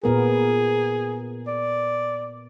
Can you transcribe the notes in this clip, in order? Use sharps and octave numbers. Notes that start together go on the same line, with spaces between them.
A#2 B3 G#4 A#4
D5